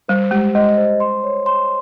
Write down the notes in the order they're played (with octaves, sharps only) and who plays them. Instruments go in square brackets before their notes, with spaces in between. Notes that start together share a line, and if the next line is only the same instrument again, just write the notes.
[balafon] G3 [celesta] C5
[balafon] G#3 [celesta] G4
[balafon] G#3 [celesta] D#5
[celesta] C5
C6
C#5
C6